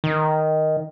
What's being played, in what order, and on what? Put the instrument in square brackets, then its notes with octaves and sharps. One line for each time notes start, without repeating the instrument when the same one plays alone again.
[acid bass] D#3